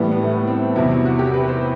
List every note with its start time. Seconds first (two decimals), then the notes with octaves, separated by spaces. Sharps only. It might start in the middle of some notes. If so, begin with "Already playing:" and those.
Already playing: A2 E3 G3 B3
0.12 B3
0.23 A3
0.33 B3
0.47 C4
0.76 E2 C3 F#3 E4
1.05 F#4
1.19 G4
1.34 B4
1.48 C5